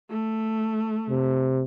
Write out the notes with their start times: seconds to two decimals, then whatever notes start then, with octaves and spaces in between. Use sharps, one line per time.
0.10 A3
1.10 C3